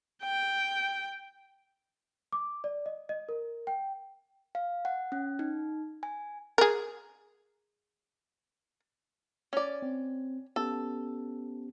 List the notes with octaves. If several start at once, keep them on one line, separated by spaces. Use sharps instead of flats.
G5
D6
D5
D#5
D#5
A#4
G5
F5
F#5
C#4
D#4
G#5
G#4 A#4
C#4 D5
C4
B3 C#4 G4 A4